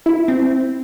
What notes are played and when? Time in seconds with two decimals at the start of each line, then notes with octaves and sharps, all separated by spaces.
0.06 E4
0.28 C4